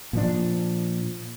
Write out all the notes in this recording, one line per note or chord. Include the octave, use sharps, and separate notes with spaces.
A#2 F3 D4